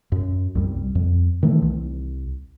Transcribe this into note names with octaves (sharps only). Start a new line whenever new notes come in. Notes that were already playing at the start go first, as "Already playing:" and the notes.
F#2
C2 F#2 G3
F2
D#3 E3 A3
C2